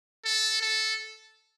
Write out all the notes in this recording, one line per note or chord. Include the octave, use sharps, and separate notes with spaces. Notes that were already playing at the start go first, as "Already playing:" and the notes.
A4
A4